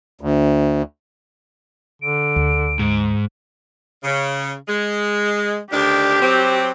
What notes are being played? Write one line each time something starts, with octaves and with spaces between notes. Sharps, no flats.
D2
D3 D7
D2
G#2
C#3
G#3
D2 D#3 D4 G4
F#3 C4